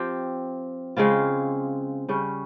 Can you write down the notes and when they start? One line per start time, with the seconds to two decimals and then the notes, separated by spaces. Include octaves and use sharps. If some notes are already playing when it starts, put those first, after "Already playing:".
Already playing: F3 C4 G4
0.97 C#3 G#3 C4 F4
2.09 C#3 G3 C#4